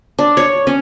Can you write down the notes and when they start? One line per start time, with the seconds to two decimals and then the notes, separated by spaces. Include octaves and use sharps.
0.19 D4
0.37 C#5
0.67 C#4